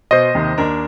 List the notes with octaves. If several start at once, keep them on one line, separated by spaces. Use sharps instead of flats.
B2 C5 D#5 C6
D#2 C3 D#3
D#2 D4 A#4